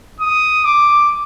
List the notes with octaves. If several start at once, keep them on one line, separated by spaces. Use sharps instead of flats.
D#6
D6